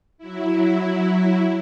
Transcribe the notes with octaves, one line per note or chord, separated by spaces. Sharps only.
F#3 E4